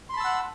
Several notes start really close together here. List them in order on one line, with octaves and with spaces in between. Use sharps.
C6 B5 A5 E6 F#5